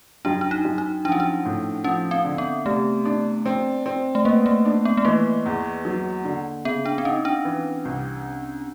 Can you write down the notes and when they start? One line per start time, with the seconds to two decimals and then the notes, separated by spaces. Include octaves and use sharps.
0.25 F#2 D4
0.41 D4
0.51 D#4
0.65 F#2
0.78 D#4
1.05 F3 D4
1.12 C#4
1.20 D4
1.45 A2
1.84 F3 C#4
2.11 C4
2.25 D3
2.38 B3
2.66 C3 A3
3.05 D4
3.46 C4
3.86 C4
4.15 A3
4.25 A#3 B3
4.46 A3
4.65 D4
4.85 B3
4.97 A3
5.05 E3 A#3
5.46 E2
5.85 F#3
6.25 D3
6.65 C#3 B3
6.86 D4
6.98 C4
7.05 C#4 D#4
7.25 D4
7.45 E3
7.85 C2